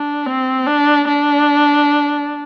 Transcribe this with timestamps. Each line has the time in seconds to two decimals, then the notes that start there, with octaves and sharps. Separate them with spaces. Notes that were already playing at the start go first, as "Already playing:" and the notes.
Already playing: D4
0.26 C4
0.67 D4
1.08 D4